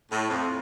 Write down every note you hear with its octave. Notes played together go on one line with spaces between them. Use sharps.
A2
F2